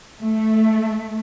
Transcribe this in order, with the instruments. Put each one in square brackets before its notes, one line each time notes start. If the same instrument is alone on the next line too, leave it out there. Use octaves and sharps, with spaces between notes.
[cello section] A3